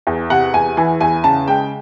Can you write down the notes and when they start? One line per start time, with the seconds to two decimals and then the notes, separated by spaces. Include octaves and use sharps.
0.07 E2
0.30 C3 F#5
0.54 E2 G#5
0.77 E3 G#5
1.01 E2 G#5
1.24 C#3 A5
1.48 G#3 G5